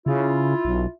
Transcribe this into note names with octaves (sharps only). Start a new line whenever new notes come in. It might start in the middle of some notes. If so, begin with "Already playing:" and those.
C#3 E4 F4
B1